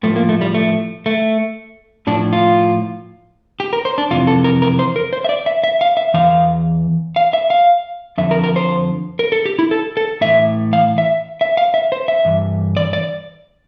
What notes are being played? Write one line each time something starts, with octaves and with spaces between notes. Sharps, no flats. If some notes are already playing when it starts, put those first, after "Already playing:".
A2 F3 A3
A#3
A3
G3
A3
A3
A2 F3 D4
F4
G4
A#4
C5
D4
F2 C3 E3 F4
A4
A#4
A#4
C5
A#4
C5
E5
D5
E5
E5
F5
E5
E2 E3 F5
F5
E5
F5
F2 D3 F3 E5
A#4
A#4
C5
A#4
A4
G4
E4
A4
A4
A2 E3 E5
F5
E5
E5
F5
E5
C5
E5
G2 E3
D5
D5